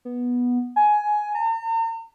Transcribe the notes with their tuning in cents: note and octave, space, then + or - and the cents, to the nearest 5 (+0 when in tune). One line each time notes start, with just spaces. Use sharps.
B3 -10
G#5 +15
A#5 -45